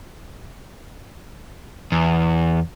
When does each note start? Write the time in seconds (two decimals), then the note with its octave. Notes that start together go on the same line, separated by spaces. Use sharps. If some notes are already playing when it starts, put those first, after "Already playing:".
1.92 E2